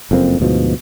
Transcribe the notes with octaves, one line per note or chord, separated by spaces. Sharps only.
F#1 F2 A#3 C4
D2 G#2 B2 F3